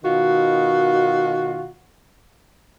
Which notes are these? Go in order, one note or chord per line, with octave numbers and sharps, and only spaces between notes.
B2 D#3 F4 F#4